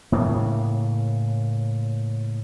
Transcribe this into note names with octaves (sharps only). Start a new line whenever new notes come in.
A2 C#3 A#3